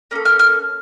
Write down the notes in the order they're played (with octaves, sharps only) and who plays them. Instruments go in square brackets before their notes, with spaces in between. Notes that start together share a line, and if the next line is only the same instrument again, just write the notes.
[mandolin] A#3 C#4 A4
F6
F6